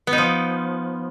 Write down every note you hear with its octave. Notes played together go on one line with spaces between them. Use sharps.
B3
D#4
F3